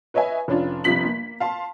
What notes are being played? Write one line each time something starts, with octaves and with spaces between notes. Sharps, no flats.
B4 C#5 D#5 E5 G#5
F1 C#4 D4 F4
G1 C3 F3 F4 B6 F#7
A#3
F5 A5 C6